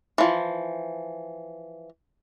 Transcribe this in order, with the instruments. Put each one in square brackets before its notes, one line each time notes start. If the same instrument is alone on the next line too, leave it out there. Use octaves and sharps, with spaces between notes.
[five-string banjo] E3 F3